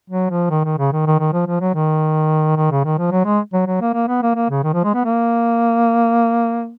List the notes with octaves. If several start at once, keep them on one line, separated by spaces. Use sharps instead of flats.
F#3
F3
D#3
D#3
C#3
D#3
D#3
D#3
F3
F3
F#3
D#3
D#3
C#3
D#3
F3
F#3
G#3
F#3
F#3
A#3
A#3
B3
A#3
A#3
C#3
D#3
F3
G#3
B3
A#3